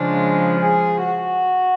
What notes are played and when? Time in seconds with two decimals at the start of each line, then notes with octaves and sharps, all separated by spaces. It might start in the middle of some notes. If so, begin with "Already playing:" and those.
Already playing: C#3 F3 G#3 D4
0.61 G#4
1.04 F#4